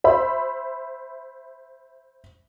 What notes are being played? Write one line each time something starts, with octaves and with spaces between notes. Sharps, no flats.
C5 E5 B5